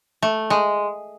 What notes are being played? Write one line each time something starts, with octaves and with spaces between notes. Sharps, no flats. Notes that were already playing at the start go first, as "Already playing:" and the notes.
A3
G#3